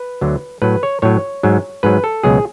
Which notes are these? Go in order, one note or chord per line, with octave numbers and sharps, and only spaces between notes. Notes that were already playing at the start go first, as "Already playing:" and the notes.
Already playing: B4
D2 D3 F#3
A2 F#3 B4
C#5
A2 F#3 C#5
G#2 F#3
G#2 F#3 B4
A4
C#2 B2 F#3 G#4